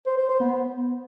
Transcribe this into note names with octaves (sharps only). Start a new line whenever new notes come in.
C5
C5
C5
B3